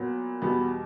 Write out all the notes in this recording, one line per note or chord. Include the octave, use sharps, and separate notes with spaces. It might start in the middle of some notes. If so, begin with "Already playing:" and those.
Already playing: A#2 F#3 B3
E2 B2 G3 B3